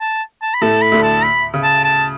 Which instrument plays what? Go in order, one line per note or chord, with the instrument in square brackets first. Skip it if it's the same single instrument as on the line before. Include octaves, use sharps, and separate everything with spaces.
[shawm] A5
A5
B5
[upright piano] A2 A3 [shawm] A5
[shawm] B5
[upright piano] D2 D3
[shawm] A5
B5
[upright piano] C#3
[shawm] A5
A5